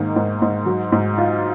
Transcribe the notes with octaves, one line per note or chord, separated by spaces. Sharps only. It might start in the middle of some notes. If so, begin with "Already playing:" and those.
Already playing: G#2 D#3 A#3
G#2
G#2
F#3
G#2
F4